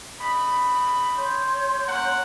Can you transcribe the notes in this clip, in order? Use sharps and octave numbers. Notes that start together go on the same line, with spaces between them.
C#3 D#5 B5
C#5 C6 G6
A#3 C#4 F#5